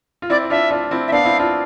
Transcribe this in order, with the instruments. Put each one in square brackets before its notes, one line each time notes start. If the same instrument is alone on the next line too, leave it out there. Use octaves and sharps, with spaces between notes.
[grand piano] F4
[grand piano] C4 E4 [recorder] D5
[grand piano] D4 F4 [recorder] E5
[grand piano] D4 F4
C4 E4
[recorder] E5
[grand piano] B3 D4 [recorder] F5
[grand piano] C4 E4
D4 F4